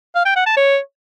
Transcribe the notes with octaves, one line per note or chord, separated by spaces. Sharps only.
F5
G5
F#5
A5
C#5